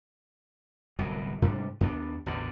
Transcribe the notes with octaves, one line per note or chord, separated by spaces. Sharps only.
D1 C2 B2 F#3
G#2 C3 G3 D4
D#2 B3 D4
A1 E2 B2 D3